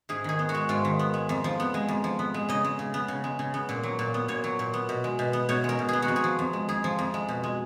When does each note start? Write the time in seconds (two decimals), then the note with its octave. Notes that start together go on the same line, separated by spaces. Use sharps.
0.09 G#2 G#4
0.24 D#3 G#4
0.39 B3
0.49 F#4
0.54 G#3
0.69 G#2 F4
0.85 D#3
0.99 B3
1.14 G#3
1.29 F2
1.44 F3
1.60 B3
1.74 G#3
1.88 F2
2.04 F3
2.19 B3
2.34 G#3
2.49 C#3 D#5
2.64 G#3
2.79 C#3
2.94 B3
3.08 C#3
3.24 G#3
3.39 C#3
3.54 B3
3.69 A#2
3.83 F#3
3.99 A#2
4.14 B3
4.28 A#2 C#5
4.44 F#3
4.59 A#2
4.74 B3
4.89 B2
5.04 G#3
5.19 B2
5.33 B3
5.49 B2 C#5
5.64 G#3 A#4
5.79 B2
5.89 B3 G#4
6.02 F#4
6.08 F2
6.16 G#4
6.24 F3
6.39 F2
6.53 G#3
6.69 F2 G#4
6.84 F3
6.99 F2
7.14 G#3
7.28 B2
7.43 G#3